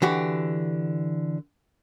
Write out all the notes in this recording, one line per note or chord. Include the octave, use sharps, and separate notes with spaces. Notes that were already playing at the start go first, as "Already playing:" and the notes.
D3 E3 F#4 G4